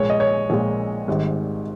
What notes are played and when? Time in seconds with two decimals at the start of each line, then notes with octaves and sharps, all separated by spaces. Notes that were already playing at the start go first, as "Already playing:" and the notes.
Already playing: A#1 A#2 G#3 C#5
0.10 D#5
0.20 C#5
0.50 A#1 A#2 G#3
1.08 G#1 G#2 G3